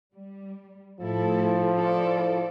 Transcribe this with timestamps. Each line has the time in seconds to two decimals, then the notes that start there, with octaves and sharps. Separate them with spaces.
0.14 G3
0.99 A2 F3 E4 A4
1.78 E4 A4 D5